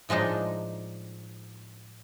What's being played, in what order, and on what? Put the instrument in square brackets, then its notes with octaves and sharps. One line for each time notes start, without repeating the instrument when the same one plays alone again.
[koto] A2 F3 G#3 D4 D#4